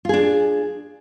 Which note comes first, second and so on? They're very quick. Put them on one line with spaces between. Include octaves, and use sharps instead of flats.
F4 G#4 D4